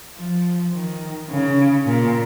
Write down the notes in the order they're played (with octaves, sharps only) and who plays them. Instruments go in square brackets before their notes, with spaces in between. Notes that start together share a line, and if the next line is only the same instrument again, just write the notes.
[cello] F3
D#3
C#3
A#2